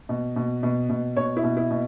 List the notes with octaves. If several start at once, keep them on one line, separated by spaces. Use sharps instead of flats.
B2
B2
B2
B2
B2 C#5
E4
B2
E4
B2